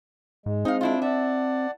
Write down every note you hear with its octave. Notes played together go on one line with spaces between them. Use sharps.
G#2 G#3
C4 D#4 F5
D4 E4 F4
D5 E5 F#5 A5